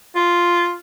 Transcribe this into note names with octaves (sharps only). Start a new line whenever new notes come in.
F4